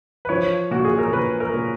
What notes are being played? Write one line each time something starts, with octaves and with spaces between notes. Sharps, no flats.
B4
F3 C#5
A#2 F#4
G#4
A#4
A#2 B4
A#4
A#2